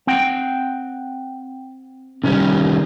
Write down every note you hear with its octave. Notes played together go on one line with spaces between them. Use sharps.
C4 F#5 G5
C3 D#3 G3 C#4